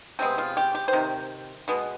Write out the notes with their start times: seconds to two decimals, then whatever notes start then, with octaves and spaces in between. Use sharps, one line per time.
0.19 C3 D#3 G#3 B3 C4
0.38 F4
0.57 G4
0.75 G4
0.88 C5
0.93 C3 D#3
1.68 B2 G#3 B3